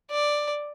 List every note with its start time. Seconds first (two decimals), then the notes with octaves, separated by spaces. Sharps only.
0.11 D5